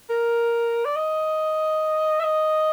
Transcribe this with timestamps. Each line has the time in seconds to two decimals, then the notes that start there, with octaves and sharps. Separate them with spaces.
0.10 A#4
0.85 D5
0.96 D#5
2.20 E5
2.23 D#5